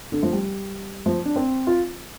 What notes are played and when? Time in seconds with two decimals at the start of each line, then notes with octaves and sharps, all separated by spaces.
0.12 D3
0.23 F3
0.33 G3
1.06 F3
1.25 D4
1.36 C4
1.67 F4